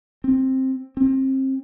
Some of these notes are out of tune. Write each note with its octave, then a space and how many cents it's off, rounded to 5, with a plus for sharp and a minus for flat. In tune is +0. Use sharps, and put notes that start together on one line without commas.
C4 +10
C4 +25